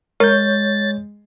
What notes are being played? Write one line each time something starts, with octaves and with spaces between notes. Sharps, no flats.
G#3 A#4 C#5 G6 A6